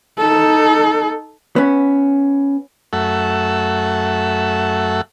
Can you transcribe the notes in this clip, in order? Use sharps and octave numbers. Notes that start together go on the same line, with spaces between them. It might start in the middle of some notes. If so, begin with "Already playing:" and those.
D#4 A4
B3 C#4
F#2 A3 A4 E5 F#5